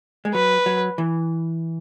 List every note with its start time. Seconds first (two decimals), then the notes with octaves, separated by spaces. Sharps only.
0.25 G#3
0.34 F#3 B4
0.66 F#3
0.98 E3